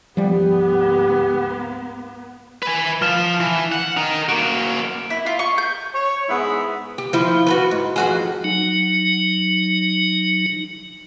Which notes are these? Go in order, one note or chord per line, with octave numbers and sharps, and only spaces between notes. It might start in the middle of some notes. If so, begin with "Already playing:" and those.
D2 G#2 F3 G3 B3 G4
B4 G#5
F3 F6 E7
E3
F#5
D#4 A#4
A#3 F#4 D7
E4
F4
C#6
G6
C#5
G#2 B3 E4 G#4 E5 B5
G4
F3 E4
F#4 A4 B4
G#2
F2 F#4 G#4
F#3 D#4